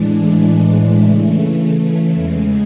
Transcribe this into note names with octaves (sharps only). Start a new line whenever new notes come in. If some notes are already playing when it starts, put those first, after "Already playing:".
Already playing: A2 E3 G#3 D4
C#3 E3 A3
E2 C#3 G#3